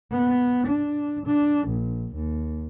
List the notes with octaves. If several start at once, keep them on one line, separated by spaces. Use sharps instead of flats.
B3
D4
D4
A#1
D#2